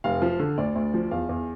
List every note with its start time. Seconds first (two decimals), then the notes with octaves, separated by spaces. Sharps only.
0.04 F1 F5
0.22 F3
0.39 D3
0.58 D2 D5
0.75 D2
0.94 F3
1.11 E2 F5
1.29 E2